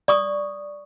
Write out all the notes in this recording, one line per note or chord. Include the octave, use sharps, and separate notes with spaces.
D5 C#6 D#6